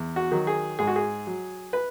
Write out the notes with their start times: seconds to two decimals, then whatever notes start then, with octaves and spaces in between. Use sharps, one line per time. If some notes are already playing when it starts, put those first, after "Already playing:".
Already playing: E2
0.16 F#4
0.32 D#3 F#3
0.47 G#4
0.79 G#2 G#4
0.87 F#4
0.96 G#4
1.27 F#3
1.73 B4